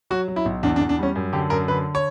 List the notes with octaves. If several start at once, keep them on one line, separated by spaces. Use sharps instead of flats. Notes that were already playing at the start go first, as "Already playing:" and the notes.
F#3 F#4
F#3
E4
B1
E2 D4
D4
E2
D4
G3 C#4
F#2
D3 G4
F#2 A#4
D3 B4
C#5